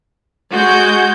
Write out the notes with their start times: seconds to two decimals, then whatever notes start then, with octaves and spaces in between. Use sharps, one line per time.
0.52 G#3 F#4 G6